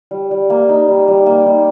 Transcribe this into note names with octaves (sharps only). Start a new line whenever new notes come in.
G3
G3
A#3
D#4
G3
G3
A#3
D#4